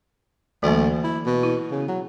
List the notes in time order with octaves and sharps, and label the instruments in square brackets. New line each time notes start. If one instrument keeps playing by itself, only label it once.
[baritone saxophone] D2 [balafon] E3 F#3 A#3
[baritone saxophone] E4
B2
[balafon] E4
[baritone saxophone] C#3
F#3